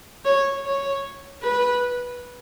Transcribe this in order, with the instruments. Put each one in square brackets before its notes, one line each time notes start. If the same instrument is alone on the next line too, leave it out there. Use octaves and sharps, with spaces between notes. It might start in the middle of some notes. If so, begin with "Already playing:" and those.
[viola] C#5
C#5
B4